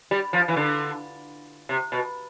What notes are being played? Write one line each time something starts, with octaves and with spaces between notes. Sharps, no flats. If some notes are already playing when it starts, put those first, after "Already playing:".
G3
F3
E3
D3
C3
B2